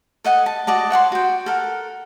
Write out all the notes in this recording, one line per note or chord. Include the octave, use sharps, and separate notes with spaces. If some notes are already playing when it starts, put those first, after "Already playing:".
A4 D#5 F#5 G#5
A5
F#4 D5 D#5 A5
C#5 F#5 A5 C6
F#4 G5
A4 A#4 F#5